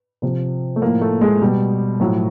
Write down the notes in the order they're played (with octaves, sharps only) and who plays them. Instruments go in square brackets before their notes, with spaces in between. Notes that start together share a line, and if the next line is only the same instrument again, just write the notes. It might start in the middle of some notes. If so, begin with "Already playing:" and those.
[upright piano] C3 F3
A3
A2 F3 A#3
A3
G#3
B2 G3
A2 F3 F#3